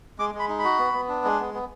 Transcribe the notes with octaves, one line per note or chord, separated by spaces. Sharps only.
G#3 D6
G#3 B5
D#4
B5
F#4
B3
B3
D4
G#3
B3
B3